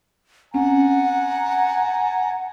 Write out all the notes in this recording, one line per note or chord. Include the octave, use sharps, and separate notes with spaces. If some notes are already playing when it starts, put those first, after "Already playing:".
C4 C#4 F#5 G#5 A#5